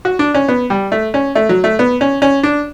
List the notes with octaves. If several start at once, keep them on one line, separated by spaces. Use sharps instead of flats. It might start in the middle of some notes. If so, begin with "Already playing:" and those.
F#4
D4
C#4
B3
G3
A3
C#4
A3
F#3
A3
B3
C#4
C#4
D4